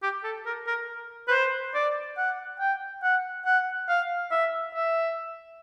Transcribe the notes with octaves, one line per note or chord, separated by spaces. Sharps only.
G4
A4
A#4
A#4
B4
C5
D5
F#5
G5
F#5
F#5
F5
E5
E5